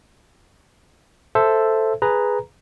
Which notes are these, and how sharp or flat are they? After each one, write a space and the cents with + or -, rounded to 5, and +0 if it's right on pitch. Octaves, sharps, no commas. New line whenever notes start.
A4 +0 C5 +0 E5 +10
G#4 +0 B4 +0 A#5 +0